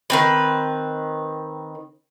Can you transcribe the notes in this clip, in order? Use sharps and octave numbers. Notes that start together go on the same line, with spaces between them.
D#3 C4 B4